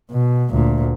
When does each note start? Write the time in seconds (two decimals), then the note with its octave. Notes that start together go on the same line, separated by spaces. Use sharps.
0.12 B2
0.50 D2 A#2